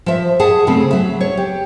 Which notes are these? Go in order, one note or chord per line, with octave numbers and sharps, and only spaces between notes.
F3 E5
G#4 F#5 A5
C#3 F#3 A3 C4
F#3 E5
C#5
G4